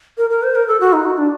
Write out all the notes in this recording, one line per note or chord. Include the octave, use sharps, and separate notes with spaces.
A#4
A#4
C5
A#4
A4
F#4
D#4
F#4
D4